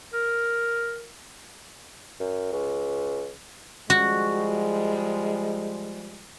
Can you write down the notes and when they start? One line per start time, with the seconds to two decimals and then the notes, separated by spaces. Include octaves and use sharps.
0.13 A#4
2.20 F#2
2.53 C#2
3.90 F3 G3 G#3 F#4